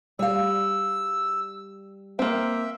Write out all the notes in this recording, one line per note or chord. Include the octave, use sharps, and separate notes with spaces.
G3 F5 E6
A#3 C4 E5